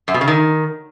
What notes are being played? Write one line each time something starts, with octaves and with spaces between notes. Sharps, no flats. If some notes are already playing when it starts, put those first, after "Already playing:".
F#2
B2
C#3
D#3